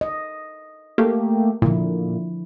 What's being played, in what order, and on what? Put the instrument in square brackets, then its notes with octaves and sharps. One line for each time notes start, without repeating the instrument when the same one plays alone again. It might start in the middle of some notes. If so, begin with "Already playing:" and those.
[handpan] D#5
[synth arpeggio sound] A3 A#3 G4
[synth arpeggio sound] A#2 [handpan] D3 F3 E4